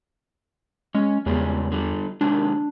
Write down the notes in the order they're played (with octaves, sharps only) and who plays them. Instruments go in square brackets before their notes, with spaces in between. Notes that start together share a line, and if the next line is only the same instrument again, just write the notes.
[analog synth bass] G#3 [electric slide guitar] C#4
[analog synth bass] E2 [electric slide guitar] C#3 G3 G#3
[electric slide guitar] D3 G3
[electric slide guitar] C3 D#3 G#3 [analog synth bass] D4